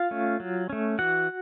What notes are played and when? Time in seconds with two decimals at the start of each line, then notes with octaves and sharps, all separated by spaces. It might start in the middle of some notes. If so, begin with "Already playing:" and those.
Already playing: F4 F5
0.11 A3 C#4
0.40 F#3
0.70 A3 C#4
0.99 E3 F#4 F#5